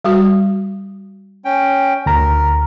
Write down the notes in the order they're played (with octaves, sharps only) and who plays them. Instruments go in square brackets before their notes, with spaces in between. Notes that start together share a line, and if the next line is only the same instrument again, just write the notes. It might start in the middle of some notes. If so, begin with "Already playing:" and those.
[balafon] G3 F#4
[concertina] C#4 G5
[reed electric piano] D2 A#5 [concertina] A#4